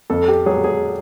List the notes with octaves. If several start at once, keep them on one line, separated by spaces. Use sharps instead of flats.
F2 A4
G4
F#3 G#4
G#4